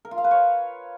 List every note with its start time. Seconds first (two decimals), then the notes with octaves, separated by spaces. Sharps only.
0.05 A#4
0.11 F4
0.18 F5
0.24 B4
0.31 C#5